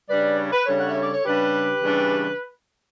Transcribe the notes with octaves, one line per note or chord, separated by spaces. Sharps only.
C#3 G3 D4 B4 D5
C#5
B4
C#3 G3 D4 A4 C#5
F#5
E5
D5
C#5
C#3 G3 D4 G4 B4
C#3 E3 G3 D4